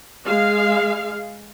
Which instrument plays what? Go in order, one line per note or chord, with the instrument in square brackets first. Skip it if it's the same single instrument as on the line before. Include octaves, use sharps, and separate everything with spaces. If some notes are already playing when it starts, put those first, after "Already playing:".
[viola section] G#3 F5